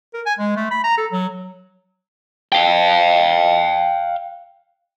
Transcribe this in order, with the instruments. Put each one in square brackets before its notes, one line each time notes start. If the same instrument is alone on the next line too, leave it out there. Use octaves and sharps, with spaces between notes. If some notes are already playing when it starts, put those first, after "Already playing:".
[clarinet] A#4
G#5
G#3
A3
B5
A#5
A4
F#3
[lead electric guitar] F5 G5